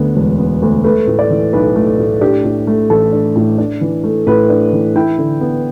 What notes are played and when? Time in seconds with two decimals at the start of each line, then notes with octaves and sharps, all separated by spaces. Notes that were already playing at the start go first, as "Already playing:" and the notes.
Already playing: D2 D3 B3
0.16 E1
0.39 B3
0.62 D2
0.84 A3 B4
1.07 A2
1.19 D5
1.30 E3
1.53 B1 B4
1.76 A3
1.98 A2
2.21 D4 G4
2.44 A2
2.67 A3
2.90 A1 A4
3.13 D4
3.36 A2
3.58 D4
3.81 E3
4.04 A3
4.27 A2 B4
4.50 D4
4.73 E3
4.96 E4 G5
5.18 D3
5.41 B3